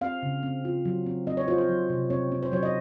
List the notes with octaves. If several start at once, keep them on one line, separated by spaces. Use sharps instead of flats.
C4 F5
C#3
C4
F4
F#3
C4
C4 D#5
C#5
F4 C5
C5
F#3
C3
C4 C#5
C4
C5
F#3 C#5
D#5